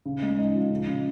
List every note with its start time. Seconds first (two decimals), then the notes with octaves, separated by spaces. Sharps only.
0.05 C#3
0.22 G#3
0.38 D#4
0.55 F3
0.70 C#3
0.87 C#3